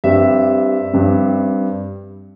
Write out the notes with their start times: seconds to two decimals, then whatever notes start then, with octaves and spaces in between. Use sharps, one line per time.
0.04 G2 G3 C4 E5
0.93 G2 G3 C4